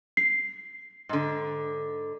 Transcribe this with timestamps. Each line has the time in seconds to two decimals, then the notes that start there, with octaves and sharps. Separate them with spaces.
0.17 C7
1.09 G#2 D3